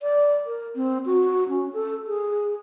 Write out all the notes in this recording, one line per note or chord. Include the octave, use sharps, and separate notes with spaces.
D5
A#4
C4
F#4
C#4
A4
G#4